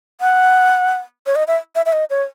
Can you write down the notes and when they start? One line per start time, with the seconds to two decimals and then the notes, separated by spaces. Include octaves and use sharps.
0.21 F#5
1.26 C#5
1.35 D#5
1.47 E5
1.75 E5
1.86 E5
1.92 D#5
2.10 C#5